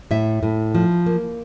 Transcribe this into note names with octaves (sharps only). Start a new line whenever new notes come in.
A2 E5
A2
F3
A#3